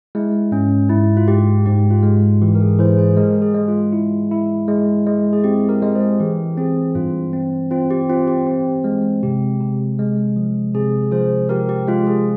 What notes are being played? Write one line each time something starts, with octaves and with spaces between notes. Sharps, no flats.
G#3 E4
G#2 C#4
G#2 E4
F4
G#2 G4
G#2 G4
F4
G#3
F4
E3 G4
A#4
G#4
E3 G#4 C5
G#4 C5
G#3 G4 A#4
G#4
G#3
F4
E4
E4
G#3
G#3
G#4
C4 G4
G4 A#4
G#3
G#4 C5
E3 G4 A#4
C4 G#4
G2 F4
C4
C4 F4
G4
C4 F4
G4
C4
G#3
C3 G4
C3
G#3
F3
C3 G#4
F3 G#4 C5
F3 G4 A#4
G4
G#3 F4
G#4